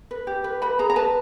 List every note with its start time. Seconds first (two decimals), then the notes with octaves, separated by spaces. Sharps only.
0.11 B4
0.27 G4
0.44 B4
0.62 B4 B5
0.79 G#4 A#5
0.90 A#5
0.96 B4 A5